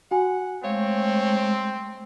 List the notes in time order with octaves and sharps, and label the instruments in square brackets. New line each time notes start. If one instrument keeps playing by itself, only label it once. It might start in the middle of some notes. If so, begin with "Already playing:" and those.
[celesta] F#4 G#5 [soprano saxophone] F#5
[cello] G#3 A3 [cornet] C4 [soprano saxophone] C#5 [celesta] F5